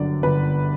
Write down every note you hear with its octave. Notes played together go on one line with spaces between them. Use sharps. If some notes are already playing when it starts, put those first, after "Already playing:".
Already playing: G1 F#2 D3 D5
G1 B4